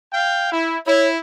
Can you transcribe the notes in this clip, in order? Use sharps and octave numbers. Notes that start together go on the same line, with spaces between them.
F5 G5
E4
E4 C#5